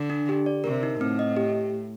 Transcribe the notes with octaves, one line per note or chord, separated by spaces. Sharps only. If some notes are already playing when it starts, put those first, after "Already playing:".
Already playing: D3
D4
G4
D5
C3 A#4
D#4
A2 C4
D#5
G4